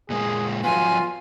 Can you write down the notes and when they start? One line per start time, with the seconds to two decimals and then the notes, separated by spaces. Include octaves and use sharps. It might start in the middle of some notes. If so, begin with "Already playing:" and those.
0.10 A#2 G#3 A#3 G#4
0.64 F3 F#3 B3 F4 G#5